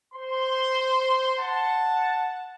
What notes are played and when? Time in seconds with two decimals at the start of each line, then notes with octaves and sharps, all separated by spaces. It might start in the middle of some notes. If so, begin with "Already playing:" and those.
0.14 C5 C6
1.38 F#5 A5